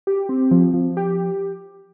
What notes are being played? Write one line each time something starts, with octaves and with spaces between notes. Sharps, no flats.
G4
C4
F3
F3
G4